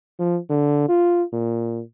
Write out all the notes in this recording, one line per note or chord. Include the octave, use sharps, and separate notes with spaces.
F3
D3
F4
A#2